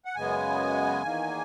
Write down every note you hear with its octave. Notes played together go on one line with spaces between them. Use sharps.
F#5
F#2 C#3 G#3 B3 G#5
E2 D#3 A#3